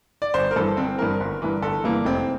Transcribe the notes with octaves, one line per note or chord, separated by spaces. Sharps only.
D5
G1 C5
A#4
G2 E3 A4
G1 C4
G2 E3 A#4
G1
G2 E3
G1 A4
G2 E3 A#3
F1 C4